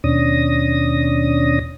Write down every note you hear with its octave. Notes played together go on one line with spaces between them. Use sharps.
D#2 B2 C#4 D4 D#6 A#6